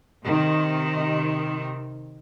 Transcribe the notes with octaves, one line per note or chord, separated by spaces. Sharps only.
C3 D#3